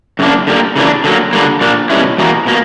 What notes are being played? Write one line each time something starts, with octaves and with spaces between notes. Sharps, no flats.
F#2 C#3 A#3 D4
D3 G3 A#3
C#3 E3 A#3 D4
D3 F#3 A#3
D3 G3 A#3
A#2 A#3 D4
B2 G3 C#4 E4
E2 B2 A#3
B2 A#3